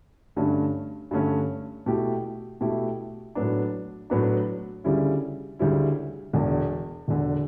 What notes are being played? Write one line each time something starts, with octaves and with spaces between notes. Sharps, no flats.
G2 D3 A3 C#4
G2 D3 A3 C#4
B2 A3 E4 G4
B2 A3 E4 G4
A2 F#3 B3 D4
A2 F#3 B3 D4
D2 C#3 G3 C#4 E4
D2 C#3 G3 C#4 E4
E1 E2 D3
E1 E2 D3